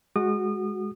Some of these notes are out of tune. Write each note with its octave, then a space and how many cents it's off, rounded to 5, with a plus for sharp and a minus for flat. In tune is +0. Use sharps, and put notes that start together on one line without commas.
G#3 +0 F#4 +0 D#6 -35